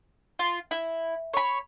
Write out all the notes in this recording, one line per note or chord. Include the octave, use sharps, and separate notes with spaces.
F4
E4
C#5 B5